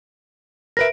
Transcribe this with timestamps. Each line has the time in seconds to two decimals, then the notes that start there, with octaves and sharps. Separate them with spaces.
0.77 A#4 B4 E5 A#6 D7